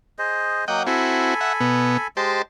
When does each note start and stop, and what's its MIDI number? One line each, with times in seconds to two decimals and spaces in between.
0.19 0.65 68
0.19 0.65 72
0.19 0.65 75
0.68 0.86 54
0.68 0.86 58
0.68 0.83 75
0.68 0.83 78
0.68 0.83 79
0.87 1.34 60
0.87 1.34 64
0.87 1.34 66
0.87 2.07 69
0.87 2.07 80
0.87 2.07 83
1.41 1.53 76
1.41 1.53 78
1.61 1.97 47
1.61 1.97 59
2.17 2.42 56
2.17 2.42 67
2.17 2.42 72
2.17 2.42 75
2.17 2.42 81